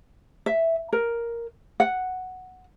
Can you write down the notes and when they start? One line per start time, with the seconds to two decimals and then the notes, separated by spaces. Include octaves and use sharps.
0.46 E5
0.93 A#4
1.80 F#5